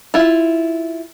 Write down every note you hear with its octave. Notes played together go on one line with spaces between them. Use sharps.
E4 F4